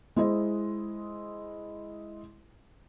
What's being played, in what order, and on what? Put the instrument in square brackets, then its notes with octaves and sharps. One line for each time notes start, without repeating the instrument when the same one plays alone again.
[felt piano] G#3 E4 C5 D#5